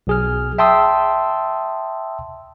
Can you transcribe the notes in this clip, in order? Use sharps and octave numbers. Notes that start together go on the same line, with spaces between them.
B1 G#4 F6
E5 G5 A5 C6 D#6 E6